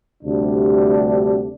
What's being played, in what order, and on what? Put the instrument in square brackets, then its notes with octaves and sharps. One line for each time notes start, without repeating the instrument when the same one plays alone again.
[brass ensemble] D2 C3 G3 D4